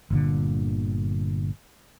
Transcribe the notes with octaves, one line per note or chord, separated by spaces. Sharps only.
G1 A#2 D3